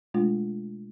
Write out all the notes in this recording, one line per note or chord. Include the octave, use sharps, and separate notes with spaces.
B2 G#3 A3 D4 F4